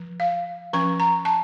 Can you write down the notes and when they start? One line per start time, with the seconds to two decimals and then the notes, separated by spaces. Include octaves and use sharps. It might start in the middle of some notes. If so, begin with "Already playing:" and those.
Already playing: F3
0.20 F5
0.73 F3 C#4 C#6
1.00 A#5
1.25 A5